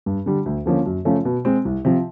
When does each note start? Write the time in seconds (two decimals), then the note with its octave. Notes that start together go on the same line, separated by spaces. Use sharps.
0.06 G2
0.26 D3 G3
0.46 D2
0.66 D3 F3 A#3 C#4
0.86 F#2
1.05 C#3 F3 A3 C#4
1.25 B2
1.45 G#3 C4
1.65 C2
1.85 C3 F3